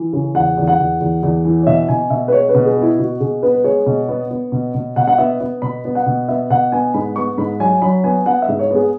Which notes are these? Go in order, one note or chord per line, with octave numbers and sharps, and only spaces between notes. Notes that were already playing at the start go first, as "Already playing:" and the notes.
Already playing: E3
C#3
E2 F#5
E2
F#5
E2
E2
E2
E3
C#5
B2 E5
B2 G#5
B2 E5
B4
G#3 C#5
B4
B2
G#4
B3
E4
B2 F#4
B2 G#4
B3 B4
B4
G#3 C#5
B2
B3
B3
B2
B2
B2 F#5
F#5
B3 E5
B3
B2 B5
B3
F#5
B2
B3 E5
B2 F#5
B3 G#5
G#2 B5
B3 C#6
G#2 B5
F#3 G#5
F#3 B5
B3 G#5
B3 F#5
E5
G#2
C#5
B3
G#4